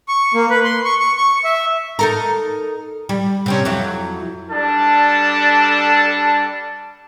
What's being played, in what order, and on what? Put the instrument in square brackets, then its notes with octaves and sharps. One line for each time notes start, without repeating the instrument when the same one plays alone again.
[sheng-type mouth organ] C#6
A#3
B4
C6
C#6
C#6
C#6
E5
[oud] D#4 A4 A#4
G3
C3 C4 C#4
F2 F#3 E4
[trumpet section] G3 D4 A4 A5